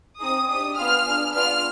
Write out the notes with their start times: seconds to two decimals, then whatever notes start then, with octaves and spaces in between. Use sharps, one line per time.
0.20 C4 D#4 G#4 D#6
0.48 D4 G4 D#6
0.76 B3 F4 G#4 F6
1.05 D4 G#4
1.33 B3 D4 F4 F6